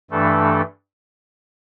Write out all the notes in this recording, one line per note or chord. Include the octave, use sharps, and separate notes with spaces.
G2 E3 A3 D4 A4